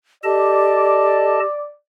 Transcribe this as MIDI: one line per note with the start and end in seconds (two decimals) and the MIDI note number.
0.24 1.45 67
0.24 1.40 69
0.24 1.73 74
0.24 1.40 75
0.24 1.40 81